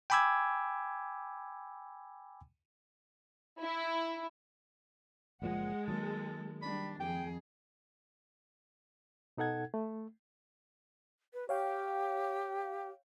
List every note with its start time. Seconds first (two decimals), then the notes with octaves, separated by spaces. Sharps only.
0.10 G5 G#5 B5 D6 E6 G#6
3.61 E4
5.42 F#1 A#2 F3 G#3 F#5
5.88 D#3 F#3 A#3 A4
6.62 G3 D4 B5
7.00 F2 G#4 G5
9.37 B2 D#4 A4 F#5 G#6
9.74 A3
11.34 B4
11.49 G4 C#5 F5 G5